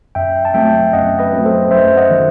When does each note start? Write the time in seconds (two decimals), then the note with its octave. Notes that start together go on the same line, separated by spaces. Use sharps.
0.15 F#2 E5 G5
0.45 A5
0.54 F#3 A3 C4 E5 G5
0.93 F#2 D#5 F#5
1.19 B4 D#5
1.32 F#3 A3 C4
1.45 A4 C5
1.71 F#2 C5 E5
1.97 D#5 F#5
2.10 D#3 F#3